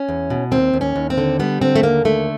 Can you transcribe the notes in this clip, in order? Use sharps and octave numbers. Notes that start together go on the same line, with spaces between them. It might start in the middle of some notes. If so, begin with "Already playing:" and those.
Already playing: C#4
E2
B2
D#2 C4
D#2
C#4
D#2
C4
D3
G3 B3
D3 C4
A3
D#2 A#3
D3 A3